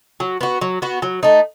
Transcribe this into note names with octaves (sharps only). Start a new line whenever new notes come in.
F#3
B3 F#4
F#3
B3 F#4
F#3
A3 D#4